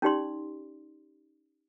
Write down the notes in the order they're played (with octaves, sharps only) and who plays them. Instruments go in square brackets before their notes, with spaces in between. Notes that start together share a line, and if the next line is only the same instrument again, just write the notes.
[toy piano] C#4 D#4 G4 D5 C6